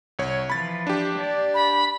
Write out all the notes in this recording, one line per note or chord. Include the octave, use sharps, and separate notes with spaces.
C2 C#5
E3 F3 B5 A6
D4 G4
D5
B5